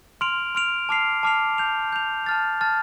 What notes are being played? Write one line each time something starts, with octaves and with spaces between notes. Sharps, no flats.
C6 F6 D7 F7
C6 F6 D7 F7
A5 D6 F6 C7 F7
A5 D6 F6 C7 F7
G6 F7
G6 F7
A5 F6 A6
A5 F6 A6